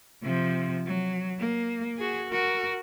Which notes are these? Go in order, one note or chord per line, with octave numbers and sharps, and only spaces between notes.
C3 F3
F#3
A#3
F#4 G#4
F#4 A#4